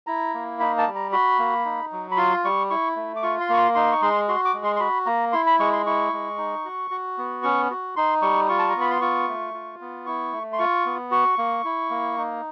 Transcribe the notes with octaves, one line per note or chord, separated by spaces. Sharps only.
E4 A#5
A#3
D#4 B5
A5
G3
A#5
F#4 B5
A#3
D#4
F#3
B5
F4 C6
G3 C#6
E4 C#6
A3
D6
F4 C#6
C6
A#3 C#6
C6
D#4 C6
C#6
G#3 C6
F#4 C6
D6
G#3
C6
C6
F#4 B5
A#3 A#5
E4 C6
B5
G#3 C#6
C6
E4 C#6
G#3
D#4
F#4
F#4
B3
C#4 C#6
F#4
D#4 C6
G3 C#6
F4 C#6
A5
A#5
B3
B5
C6
F4 C#6
A3
F4
B3
E4 C#6
A3
C6
F4 C#6
B3
F#4 C#6
A#3
E4
A#3
D#4